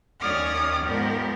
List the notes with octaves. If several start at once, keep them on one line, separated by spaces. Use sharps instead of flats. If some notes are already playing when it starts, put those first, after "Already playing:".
D#2 C#4 C#5 D5 D#6 F6
G#2 F3 B3 G4 A#4